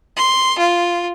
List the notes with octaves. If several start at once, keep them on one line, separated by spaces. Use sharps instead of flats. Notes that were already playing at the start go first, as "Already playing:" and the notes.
C6
F4